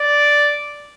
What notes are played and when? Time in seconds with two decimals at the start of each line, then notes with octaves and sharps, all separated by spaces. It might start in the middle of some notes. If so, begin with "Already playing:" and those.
Already playing: D5